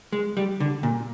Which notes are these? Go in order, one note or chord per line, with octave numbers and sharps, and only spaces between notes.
G#3
G3
D3
A#2